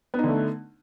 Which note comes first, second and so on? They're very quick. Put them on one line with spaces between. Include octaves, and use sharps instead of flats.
B3 D#4 D3 A3